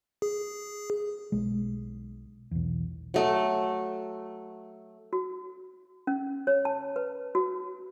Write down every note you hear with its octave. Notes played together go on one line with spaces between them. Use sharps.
G#4
B1 G#3
B1 E2
F#3 A3
F#4
C#4
C#5
A5
B4
F#4